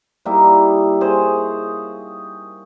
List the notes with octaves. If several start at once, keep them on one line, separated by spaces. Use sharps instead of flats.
G3 A#3 D#4 E4
G#4 C5 C#5 D#5